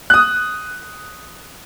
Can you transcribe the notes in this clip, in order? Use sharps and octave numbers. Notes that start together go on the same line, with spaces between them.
D#6 F#6